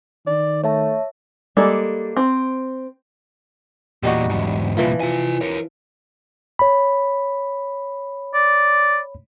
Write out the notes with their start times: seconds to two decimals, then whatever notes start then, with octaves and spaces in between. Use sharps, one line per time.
0.27 D#3 D5
0.64 A3 C#5 E5 A5
1.57 G3 G#3 A#3 D4 A4
2.17 C4
4.03 E2 A#2 G3 D#4 F#4
4.30 E2 G#2
4.77 C2 A#2 E3 F3
5.00 F4 G#5
5.41 A#4 C#5
6.59 C#5 B5
8.34 D5